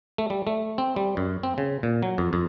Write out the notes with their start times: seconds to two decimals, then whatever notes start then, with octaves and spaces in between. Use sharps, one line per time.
0.18 A3
0.30 G3
0.47 A3
0.78 C4
0.96 G3
1.17 F#2
1.43 C4
1.58 C#3
1.83 A#2
2.03 F#3
2.18 F2
2.33 F2